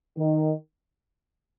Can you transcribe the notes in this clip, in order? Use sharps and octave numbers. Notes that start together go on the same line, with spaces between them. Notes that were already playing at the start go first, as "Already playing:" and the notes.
D#3